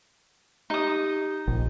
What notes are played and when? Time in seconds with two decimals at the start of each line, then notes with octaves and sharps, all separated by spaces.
0.70 D#4 G4 D#6
1.48 A#1